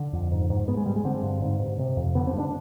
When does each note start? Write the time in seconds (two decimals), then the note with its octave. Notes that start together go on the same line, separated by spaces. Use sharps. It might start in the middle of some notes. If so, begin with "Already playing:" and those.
Already playing: D3
0.13 F2
0.32 G#2
0.50 G#2
0.67 G#2 B3
0.77 G#3
0.86 G#2 G3
0.96 G#3
1.05 D3 C4
1.23 G2
1.42 G#2
1.60 G#2
1.79 C3
1.97 F2
2.15 D3 B3
2.27 C4
2.34 G2
2.40 D4